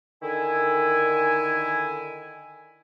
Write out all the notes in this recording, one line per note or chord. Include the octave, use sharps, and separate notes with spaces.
D3 D#3 E4 G#5